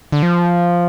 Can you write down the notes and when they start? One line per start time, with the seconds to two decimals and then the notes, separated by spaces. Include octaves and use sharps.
0.12 D3
0.23 F3